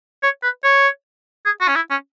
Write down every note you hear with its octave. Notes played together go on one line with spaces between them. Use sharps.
C#5
B4
C#5
G#4
F#4
C#4
E4
C#4